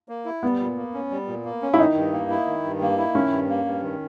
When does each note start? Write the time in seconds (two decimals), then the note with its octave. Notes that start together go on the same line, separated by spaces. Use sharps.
0.09 A#3
0.25 E4
0.43 G3 B3
0.59 A#2
0.77 A#3
0.94 C#4
1.11 G3
1.27 A#2
1.45 A#3
1.62 C#4
1.74 E4
1.78 D#3 D#4
1.96 G2
2.13 A#3
2.30 E4
2.47 D#3
2.64 G2
2.81 A#3
2.98 E4
3.15 D#3 C#4
3.32 G2
3.49 A#3
3.65 G2
3.82 D#3